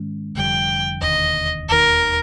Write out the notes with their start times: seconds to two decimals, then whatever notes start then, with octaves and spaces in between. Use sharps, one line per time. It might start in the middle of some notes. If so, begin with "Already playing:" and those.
Already playing: G#2 D#3 G#3 C#4
0.35 F1 F2 D3 G3 G5
1.02 E1 D#2 D3 D#5
1.68 E1 D#2 D#3 A#4